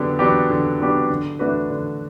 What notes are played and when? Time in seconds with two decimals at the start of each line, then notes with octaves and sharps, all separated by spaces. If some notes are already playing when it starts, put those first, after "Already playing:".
Already playing: D3 F#3 B3 D4 G4
0.19 F#3 B3 D4 G4
0.50 D3
0.80 F#3 B3 D4 G4
1.10 D3
1.39 A3 D4 F#4 B4
1.70 D3